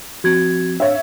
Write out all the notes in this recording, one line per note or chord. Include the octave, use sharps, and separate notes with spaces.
F3 C4 F#4 G#6
D4 C#5 E5 F5